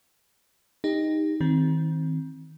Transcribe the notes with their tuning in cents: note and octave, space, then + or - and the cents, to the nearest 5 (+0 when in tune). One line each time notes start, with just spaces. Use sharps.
D#4 +0 G4 +30
D#3 +35 C4 +0